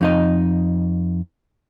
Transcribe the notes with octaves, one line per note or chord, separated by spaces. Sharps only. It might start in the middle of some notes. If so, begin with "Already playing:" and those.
F2 D#4 D#5